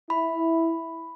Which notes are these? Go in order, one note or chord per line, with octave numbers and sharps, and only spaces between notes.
E4 B5